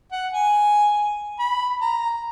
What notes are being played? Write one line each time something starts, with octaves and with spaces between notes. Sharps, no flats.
F#5
G#5
B5
A#5